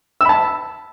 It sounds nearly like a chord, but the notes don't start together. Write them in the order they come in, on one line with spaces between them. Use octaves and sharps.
E6 B5 A5